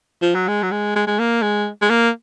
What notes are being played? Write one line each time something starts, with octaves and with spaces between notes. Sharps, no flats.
F3
F#3
G#3
F#3
G#3
G#3
G#3
A#3
G#3
G#3
A#3